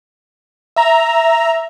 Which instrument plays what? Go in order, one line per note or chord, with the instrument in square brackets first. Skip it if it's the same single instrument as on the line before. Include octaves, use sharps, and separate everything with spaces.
[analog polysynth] E5 A#5